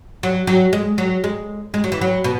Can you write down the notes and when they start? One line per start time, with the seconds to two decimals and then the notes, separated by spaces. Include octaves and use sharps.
0.23 F#3
0.47 F#3
0.73 G#3
0.98 F#3
1.24 G#3
1.74 G#3
1.84 F#3
1.92 E3
2.01 F#3
2.24 B2